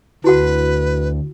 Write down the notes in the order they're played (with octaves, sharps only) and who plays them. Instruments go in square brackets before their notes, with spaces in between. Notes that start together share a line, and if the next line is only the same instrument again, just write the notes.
[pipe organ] D2 [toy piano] E4 F#4 F#5 [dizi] B4